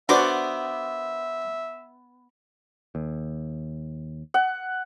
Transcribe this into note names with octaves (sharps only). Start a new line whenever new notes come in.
B3 D4 F#4 A#4 C5 D5 E5 D6
D#2
F#5